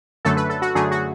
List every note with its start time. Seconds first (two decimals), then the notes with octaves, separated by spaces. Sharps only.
0.25 F#2 D3 F#3 A3 A4
0.37 B4
0.50 A4
0.62 F#4
0.75 F#2 D3 F#3 A3 G#4
0.91 F#4